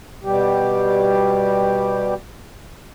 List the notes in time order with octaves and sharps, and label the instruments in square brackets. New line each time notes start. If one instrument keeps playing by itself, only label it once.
[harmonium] B2 G3 G4